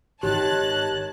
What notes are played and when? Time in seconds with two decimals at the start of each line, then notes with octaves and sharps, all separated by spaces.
0.23 G#1 D#3 G4 C#5 A5 F#6